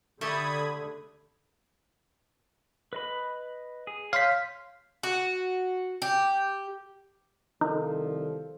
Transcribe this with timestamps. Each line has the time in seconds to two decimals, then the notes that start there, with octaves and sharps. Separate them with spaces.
0.21 D3 A3 G4 A4 B5 D#6 G#6
2.93 B4 D#5 B5
3.87 G#4
4.13 C#5 F5 C6 G6 B6
5.03 F#4
6.02 G4
7.61 C2 D#3 F3 D#4 A4